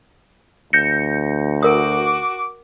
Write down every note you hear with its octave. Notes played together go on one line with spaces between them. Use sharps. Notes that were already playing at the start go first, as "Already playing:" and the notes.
D2 G6 A#6 C#7
F#4 A#4 D6 D#6